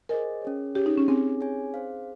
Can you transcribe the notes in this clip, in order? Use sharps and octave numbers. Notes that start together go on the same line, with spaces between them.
G#4 A#4 C5 D#5 G#5
C#4 G#4 C#5
C#4 G4 G#4 C#5
D#4
C#4
C4 G#4 C#5 G#5
G#4 C#5 G#5
G#4 C5 F5